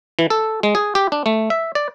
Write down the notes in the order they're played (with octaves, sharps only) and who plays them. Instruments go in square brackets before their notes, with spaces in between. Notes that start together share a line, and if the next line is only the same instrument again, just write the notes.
[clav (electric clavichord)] E3
A4
G#3
G#4
G4
D4
A3
E5
D5